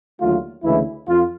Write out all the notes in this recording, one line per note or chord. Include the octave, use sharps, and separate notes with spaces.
D#2 D3 F#3 A3 F4
D2 C#3 E3 G#3 E4
F2 F4